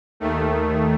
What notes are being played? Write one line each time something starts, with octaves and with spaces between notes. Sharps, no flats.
D#2 D#3 A3